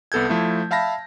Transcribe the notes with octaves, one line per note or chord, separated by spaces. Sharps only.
C2 B3 A4 G6 G#6
F3 A3 E4
E5 F5 A5 B5 A#6